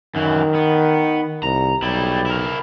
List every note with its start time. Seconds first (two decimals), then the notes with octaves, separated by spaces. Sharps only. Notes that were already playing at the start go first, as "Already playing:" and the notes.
0.15 F#2 D#3 E3
0.55 B3
1.43 C2 A#5
1.82 B1 G3 E4
2.26 E4 A#4